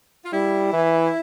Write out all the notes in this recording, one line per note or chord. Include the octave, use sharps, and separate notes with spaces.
F4
G3 E4
E3